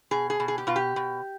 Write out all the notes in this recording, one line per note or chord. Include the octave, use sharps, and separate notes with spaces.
B2 G#4
G#4
B2
G#4
G4
B2 F4
G4
B2